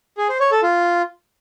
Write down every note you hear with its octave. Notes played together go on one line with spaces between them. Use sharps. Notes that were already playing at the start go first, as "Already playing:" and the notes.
G#4
C5
C#5
A4
F4